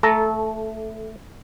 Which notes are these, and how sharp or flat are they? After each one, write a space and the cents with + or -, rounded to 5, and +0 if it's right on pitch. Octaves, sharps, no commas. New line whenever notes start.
A3 +5 A4 -15 A#5 +0